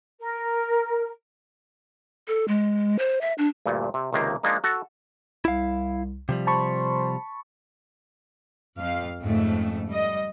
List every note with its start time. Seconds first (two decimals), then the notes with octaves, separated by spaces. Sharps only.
0.19 A#4
2.28 A4
2.48 G#3
2.99 C5
3.21 E5
3.38 D4
3.66 D2 G2 A#2
3.94 C3
4.13 C#2 C3 D#3 A#3
4.43 F3 G#3 A#3 D4 D#4
4.64 F#4 A4
5.45 C2 E4 F5
6.29 C3 F3 G3
6.47 C5 A5 B5 C#6
8.78 F2 F5
9.22 F2 G#2 C#3 A3
9.89 G3 D#5